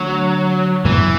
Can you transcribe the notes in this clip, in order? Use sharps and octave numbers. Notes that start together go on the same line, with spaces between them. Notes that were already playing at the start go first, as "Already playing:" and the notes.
Already playing: D3 F#3 A3 D4
F#2 C#3 E3 F#3 B3